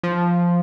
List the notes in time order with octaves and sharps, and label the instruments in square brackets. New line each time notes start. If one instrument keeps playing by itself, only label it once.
[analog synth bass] F3